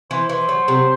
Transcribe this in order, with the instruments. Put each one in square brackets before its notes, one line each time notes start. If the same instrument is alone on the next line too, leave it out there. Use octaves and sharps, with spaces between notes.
[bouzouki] E3 [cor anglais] C5
[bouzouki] E3 [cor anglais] C5
[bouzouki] F#3
C3